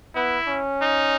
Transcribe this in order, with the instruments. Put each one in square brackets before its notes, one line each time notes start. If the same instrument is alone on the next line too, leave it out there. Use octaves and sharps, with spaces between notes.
[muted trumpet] B3 [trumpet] E4
[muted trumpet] C#4
[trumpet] D#4